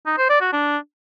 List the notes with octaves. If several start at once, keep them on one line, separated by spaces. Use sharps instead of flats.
D#4
C5
D5
F#4
D4